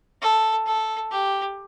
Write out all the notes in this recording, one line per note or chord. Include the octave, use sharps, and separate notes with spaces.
A4
A4
G4